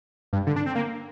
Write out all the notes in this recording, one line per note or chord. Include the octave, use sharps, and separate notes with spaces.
G2
D3
D4
C4
A#3